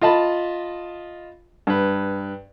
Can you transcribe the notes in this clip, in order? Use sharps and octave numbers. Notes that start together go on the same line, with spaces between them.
F4 D#5 A5 B5
G2 B4